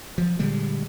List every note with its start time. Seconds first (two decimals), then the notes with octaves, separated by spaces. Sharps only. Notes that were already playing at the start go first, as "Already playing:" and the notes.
0.18 F3
0.39 A#2 D3 G3 G#3